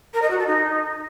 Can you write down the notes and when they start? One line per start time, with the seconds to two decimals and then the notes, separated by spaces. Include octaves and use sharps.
0.14 A#4
0.22 D#5
0.30 F#4
0.39 A4
0.47 D#4